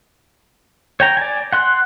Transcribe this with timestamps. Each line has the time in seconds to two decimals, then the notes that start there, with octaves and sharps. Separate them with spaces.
1.00 C#5 G5 A#5
1.17 D5 G#5
1.53 F#5 C6 F#6